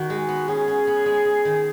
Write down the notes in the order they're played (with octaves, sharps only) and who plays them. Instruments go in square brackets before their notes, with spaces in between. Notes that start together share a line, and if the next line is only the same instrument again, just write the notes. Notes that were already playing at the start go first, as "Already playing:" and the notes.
Already playing: [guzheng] D#3 [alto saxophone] F#4
[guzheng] G#3
B3
[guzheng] C#4 [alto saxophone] G#4
[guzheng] C#4
B3
G#3
G#3
D#3